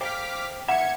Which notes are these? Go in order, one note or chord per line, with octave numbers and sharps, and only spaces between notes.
C5 F5 G5 D6 F6 B6
D#2 E5 F#5 G#6 C#7